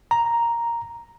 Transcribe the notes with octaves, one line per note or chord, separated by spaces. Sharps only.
A#5